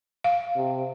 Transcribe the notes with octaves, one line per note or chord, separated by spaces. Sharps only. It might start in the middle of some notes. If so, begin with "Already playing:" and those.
F5
C3